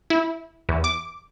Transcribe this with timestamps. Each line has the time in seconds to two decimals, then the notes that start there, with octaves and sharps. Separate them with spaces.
0.10 E4
0.69 E2
0.84 D6